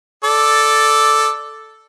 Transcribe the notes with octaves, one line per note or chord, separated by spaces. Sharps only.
A4 D5